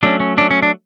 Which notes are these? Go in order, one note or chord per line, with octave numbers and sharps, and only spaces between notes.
F#3 A3 C#4 D4
C#4
F#3 A3 C#4 D4
C#4
D4